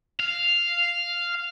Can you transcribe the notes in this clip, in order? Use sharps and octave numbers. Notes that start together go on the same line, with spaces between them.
F5